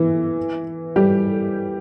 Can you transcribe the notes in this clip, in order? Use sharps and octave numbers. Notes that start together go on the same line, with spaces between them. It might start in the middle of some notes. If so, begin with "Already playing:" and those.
Already playing: E3 E4
G3 G4